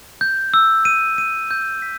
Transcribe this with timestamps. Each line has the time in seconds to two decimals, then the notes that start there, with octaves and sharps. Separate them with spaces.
0.21 G6
0.54 E6
0.85 D#7
1.18 D#7
1.51 G6
1.82 B6